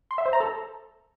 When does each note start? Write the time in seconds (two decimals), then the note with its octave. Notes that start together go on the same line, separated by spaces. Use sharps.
0.11 C6
0.18 E5
0.26 C5
0.33 A#5
0.40 A4